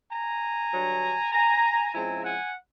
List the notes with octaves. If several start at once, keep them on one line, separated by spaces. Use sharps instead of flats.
G#5 A#5
G2 D3 F#3
G#5 A#5
C#3 F3 G#3 C4 E4 G#5 A#5
F#5 G#5